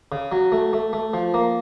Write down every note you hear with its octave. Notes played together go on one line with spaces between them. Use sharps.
C#3
F#3
A3
A3
A3
F3
A#3